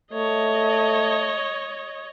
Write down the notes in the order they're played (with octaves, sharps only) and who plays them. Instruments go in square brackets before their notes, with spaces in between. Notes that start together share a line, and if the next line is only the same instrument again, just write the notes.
[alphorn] A3 [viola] C#5 D#5